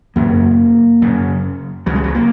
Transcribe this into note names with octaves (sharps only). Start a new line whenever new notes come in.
F#2 C#3 A#3
F#2 C#3
C#2 C#3 F#3
G#3
F#3
A#3